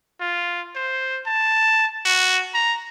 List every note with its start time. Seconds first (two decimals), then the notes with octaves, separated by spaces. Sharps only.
0.21 F4
0.75 C5
1.26 A5
2.05 F#4
2.54 A#5